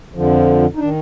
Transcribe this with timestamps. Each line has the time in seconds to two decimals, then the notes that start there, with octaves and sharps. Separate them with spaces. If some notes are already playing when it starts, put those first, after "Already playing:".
0.14 F2 D3 F3
0.75 D#4
0.78 D#3 D4